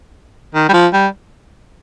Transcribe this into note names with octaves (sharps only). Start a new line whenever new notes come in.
D#3
G3
F3
G3